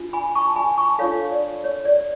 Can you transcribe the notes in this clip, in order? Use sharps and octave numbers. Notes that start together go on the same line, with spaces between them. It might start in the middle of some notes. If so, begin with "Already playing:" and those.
Already playing: D4 F4
G#5 B5
A5 C#6
G#5 B5
A5 C#6
D4 F4 A4 C#5 F5
D5
C#5
D5